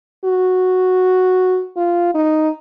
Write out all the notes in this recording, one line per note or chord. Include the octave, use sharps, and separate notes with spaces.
F#4
F4
D#4